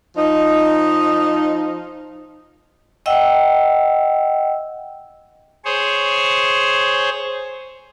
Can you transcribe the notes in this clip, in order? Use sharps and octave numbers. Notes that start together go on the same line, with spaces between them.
F3 D#4
D#5 E5 F#5 G5 E6
G#4 C5 C#5